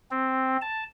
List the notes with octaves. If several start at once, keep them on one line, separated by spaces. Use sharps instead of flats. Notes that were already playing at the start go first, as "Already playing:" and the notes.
C4
A5